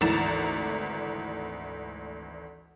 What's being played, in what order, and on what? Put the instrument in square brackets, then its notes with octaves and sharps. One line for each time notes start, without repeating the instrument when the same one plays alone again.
[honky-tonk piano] G#1 D2 E3 A#5 A6 E7